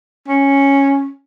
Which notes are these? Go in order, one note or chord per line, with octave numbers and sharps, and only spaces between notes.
C#4